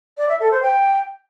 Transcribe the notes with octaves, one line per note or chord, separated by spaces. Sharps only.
D5
E5
A4
C5
G5